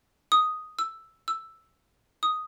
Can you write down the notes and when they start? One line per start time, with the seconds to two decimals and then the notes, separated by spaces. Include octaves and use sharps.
0.32 D#6
0.79 E6
1.28 E6
2.23 D#6